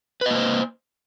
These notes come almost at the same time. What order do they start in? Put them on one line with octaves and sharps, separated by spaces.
B4 D#5 A#3 C5